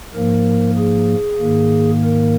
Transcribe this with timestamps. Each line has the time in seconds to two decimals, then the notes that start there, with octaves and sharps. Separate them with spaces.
0.14 G#2 F3 A#3 A#4
0.77 G#4
1.39 G#2 D#3 A#3
2.03 A#4